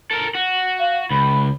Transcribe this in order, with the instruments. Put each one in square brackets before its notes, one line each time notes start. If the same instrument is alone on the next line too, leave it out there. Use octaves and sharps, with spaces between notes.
[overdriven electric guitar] A4 A#4
F#4
[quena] F5
[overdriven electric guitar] C#2 [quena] B5